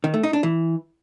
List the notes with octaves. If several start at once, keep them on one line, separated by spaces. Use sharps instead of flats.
D#3
A3
D#4
D4
E3